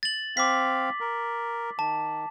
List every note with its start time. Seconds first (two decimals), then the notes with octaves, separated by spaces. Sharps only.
0.03 A6 F#7
0.37 C4 F5 D6 B6
1.01 A#4
1.79 D#3 A5